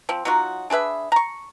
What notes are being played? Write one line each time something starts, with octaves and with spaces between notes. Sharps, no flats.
F3 C4
F#3 D#4 F4 F#4
D4 G#4 B4 E5
A#5 C#6